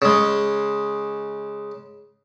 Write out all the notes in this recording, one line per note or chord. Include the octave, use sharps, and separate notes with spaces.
C#3 G#3